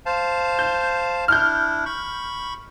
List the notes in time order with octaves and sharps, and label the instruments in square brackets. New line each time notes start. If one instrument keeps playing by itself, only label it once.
[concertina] C5 F5 A5
[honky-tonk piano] G6
[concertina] D4 E4 [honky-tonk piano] F6 G6
[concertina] B5 C#6